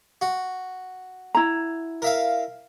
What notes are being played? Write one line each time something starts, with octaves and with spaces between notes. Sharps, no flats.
F#4
E4 A#5
A#4 E5 F5